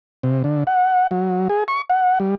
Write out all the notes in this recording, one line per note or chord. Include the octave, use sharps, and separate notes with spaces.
C3
D3
F#5
F#3
G#4
C#6
F#5
G3